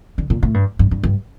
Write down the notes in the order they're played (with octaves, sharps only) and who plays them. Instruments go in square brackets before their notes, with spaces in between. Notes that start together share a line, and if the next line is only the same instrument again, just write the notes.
[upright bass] D3
A#2
A2
G2
G2
G2
G2